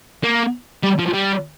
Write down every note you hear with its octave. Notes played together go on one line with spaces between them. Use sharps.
A#3
G3
F3
G3